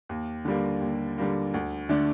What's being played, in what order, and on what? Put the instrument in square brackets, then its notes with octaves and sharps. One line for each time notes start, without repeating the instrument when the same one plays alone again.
[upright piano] D#2
D3 G3 A#3
D#2
D3 G3 A#3
D2
D3 A3 D4